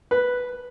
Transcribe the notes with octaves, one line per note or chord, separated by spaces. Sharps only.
B4